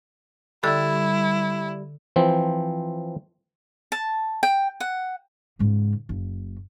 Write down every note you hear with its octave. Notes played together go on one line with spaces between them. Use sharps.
D3 G3 E4 A4 E6
E3 F3 C4
A5
G5
F#5
G#2 C#3
F#1